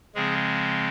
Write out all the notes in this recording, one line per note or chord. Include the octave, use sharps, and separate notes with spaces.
C#3 F3 G#3 C4 G#4